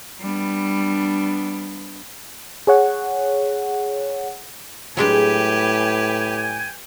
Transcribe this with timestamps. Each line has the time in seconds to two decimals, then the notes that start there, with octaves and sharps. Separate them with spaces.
0.22 G3 B3 D4
2.67 G#4 C#5 F#5
4.97 A2 F#3 G#3 D4 G4 B4 G5 G#5